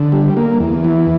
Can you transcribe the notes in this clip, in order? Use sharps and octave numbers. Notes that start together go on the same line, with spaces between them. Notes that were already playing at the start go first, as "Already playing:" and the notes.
Already playing: D3
G3
A#3
E2
E3